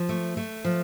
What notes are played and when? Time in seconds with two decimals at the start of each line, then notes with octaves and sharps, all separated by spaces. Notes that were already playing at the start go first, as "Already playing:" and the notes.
Already playing: F3
0.09 A3
0.37 A3
0.65 F3